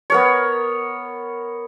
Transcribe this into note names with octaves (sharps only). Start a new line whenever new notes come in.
B3 A#4 C#5